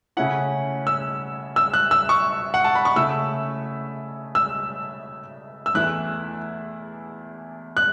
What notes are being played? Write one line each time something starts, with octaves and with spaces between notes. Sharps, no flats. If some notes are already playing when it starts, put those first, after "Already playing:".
C#3 A3 C#4 E4 F#5
E6
E6
F#6
E6
C#6
F#5
A5
B5
C#6
C#3 A3 E4 E6
E6
E6
E2 E3 A3 E4 F#6
F#6